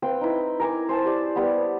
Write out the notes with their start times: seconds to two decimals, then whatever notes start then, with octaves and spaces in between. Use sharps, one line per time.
0.02 C4 B4 F5 G5
0.21 D#4 E4
0.60 A#4 G#5 D6
0.89 C5 G#5 A5
1.05 G4 D5
1.36 G3 B3